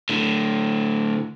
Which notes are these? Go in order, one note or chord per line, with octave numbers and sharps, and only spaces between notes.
A2 D3